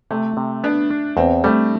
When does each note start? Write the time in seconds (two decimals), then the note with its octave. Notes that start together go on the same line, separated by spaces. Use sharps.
0.11 C3 A3
0.37 C3
0.64 B3 D4
0.91 D4
1.17 E2 C4
1.44 G3 A3